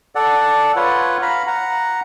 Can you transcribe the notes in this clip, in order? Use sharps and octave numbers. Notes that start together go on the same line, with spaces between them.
A4 D5 F#5
F4 B4 C#5 F#5
F5 A#5 B5
F#5 A#5